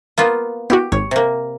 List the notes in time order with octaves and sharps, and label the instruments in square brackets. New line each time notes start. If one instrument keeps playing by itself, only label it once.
[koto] A#3 B3 F4
[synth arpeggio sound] B3 E4 F#4 [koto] G4
[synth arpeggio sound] G#1 [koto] C#5
[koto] C3 A#3